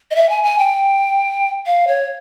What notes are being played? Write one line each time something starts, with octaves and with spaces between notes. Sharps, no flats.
D#5
E5
G#5
G#5
G5
F5
C#5